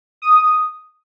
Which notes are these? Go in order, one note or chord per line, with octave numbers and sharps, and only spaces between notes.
D#6